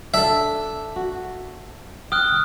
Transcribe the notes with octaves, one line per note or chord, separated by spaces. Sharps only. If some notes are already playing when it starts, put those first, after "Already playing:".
D4 A4 E5
F#4
G5 D#6 F6 F#6